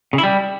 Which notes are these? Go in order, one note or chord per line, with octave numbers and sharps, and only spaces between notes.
C#3
E4
G3